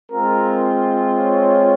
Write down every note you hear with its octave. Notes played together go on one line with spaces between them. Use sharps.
G#3 C4 F4 A#4
C#5